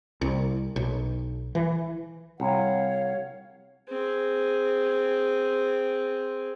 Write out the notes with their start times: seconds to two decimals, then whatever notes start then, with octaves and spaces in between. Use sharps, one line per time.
0.21 C2
0.76 B1
1.55 E3
2.40 C2 C#5 F5 F#5
3.89 C4 G#4